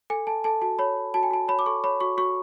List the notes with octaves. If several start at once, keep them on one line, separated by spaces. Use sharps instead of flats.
A4 G#5
A4 A5
A4 A5
F#4 A5
C#5 B5
C#5
F#4 A5
G#5
F#4 A5
C#5 B5
D6
A4 C#6
C#5 B5
F#4 C#6
F#4 C#6